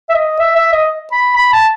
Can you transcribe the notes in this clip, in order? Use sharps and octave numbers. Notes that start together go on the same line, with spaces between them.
E5
D#5
E5
E5
D#5
B5
B5
A5